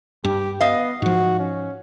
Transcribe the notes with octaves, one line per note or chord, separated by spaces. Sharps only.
G2 G4
B3 D#5 F5
G#2 F3 F#4
C#4